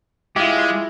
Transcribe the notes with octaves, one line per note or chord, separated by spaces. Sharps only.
G#3 E4 F4 G4